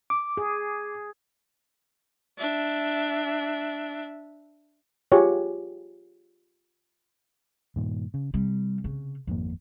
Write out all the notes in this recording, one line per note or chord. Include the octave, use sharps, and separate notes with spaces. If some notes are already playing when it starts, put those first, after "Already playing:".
D6
G#4
D4 E5
F4 G4 G#4 C#5
G2 A#2 D#3
C#3
C3 G3
C#3
G#1 F2 G#2 A#3